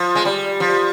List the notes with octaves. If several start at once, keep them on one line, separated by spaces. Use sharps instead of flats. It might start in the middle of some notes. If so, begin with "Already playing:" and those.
Already playing: F3
G#3
G3
F3